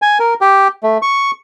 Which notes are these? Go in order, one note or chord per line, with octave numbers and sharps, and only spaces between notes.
G#5
A#4
G4
A3
C#6